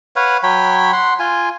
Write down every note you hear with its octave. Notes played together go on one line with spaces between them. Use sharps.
B4 C#5 F5 F#5
F#3 C#5 G5 B5
F#5 C6
F4 G#5